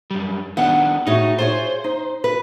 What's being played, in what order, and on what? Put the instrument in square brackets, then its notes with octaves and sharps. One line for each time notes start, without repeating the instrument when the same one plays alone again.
[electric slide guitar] F#2 G3
[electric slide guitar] D#3 B3 D4 [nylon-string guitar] F#5
[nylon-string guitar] A2 F#4 G#4 [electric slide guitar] D#4
[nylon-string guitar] F4 G#4 C#5 [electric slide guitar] C5
[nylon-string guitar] D#4
B4